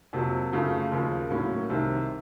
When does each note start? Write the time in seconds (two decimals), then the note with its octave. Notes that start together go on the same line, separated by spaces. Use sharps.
0.13 F2 C3 F#3 A#3
0.52 F#2 C#3 F3 A3
0.92 D#2 C#3 F3 A#3
1.30 A2 F#3 A#3 C#4
1.70 C2 C3 D#3